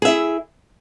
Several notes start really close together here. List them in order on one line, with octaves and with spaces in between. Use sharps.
G#4 E5 E4